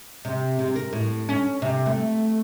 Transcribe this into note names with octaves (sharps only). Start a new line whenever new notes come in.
C3
C3
A#4
A2
C#4
C3
A3